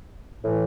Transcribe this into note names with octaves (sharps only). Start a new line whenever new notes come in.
A2 E3